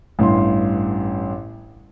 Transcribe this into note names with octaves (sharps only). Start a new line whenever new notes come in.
A1 G2 C6